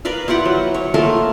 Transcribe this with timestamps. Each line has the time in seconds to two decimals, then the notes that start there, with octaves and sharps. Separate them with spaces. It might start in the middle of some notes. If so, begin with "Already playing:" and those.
0.05 A#4 B4 D5 F5
0.28 E4 F4 G4 F#5
0.45 F#3
0.74 C#5
0.94 A3 A#3 F4 A#4